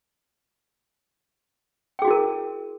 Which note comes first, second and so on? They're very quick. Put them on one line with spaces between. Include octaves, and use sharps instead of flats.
G5 G#4 F#4 E4 A#4